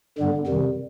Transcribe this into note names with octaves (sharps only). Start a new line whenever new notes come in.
G2 D3 G3 B3
F2 C3 D#3 G3